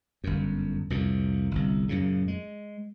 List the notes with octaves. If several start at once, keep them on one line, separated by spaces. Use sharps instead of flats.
G1 F#2
C2 F2 A#2
G1 C2
F#2 A#2 C#3
G#3